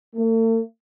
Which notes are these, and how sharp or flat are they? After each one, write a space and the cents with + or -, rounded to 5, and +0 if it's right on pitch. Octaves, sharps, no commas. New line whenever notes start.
A3 +45